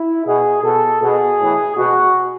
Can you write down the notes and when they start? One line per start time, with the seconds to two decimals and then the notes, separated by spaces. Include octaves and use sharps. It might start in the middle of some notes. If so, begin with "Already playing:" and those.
Already playing: E4
0.26 B2 G#4
0.63 B2 A4
1.02 B2 G#4
1.39 A2 E3
1.77 B2 F#4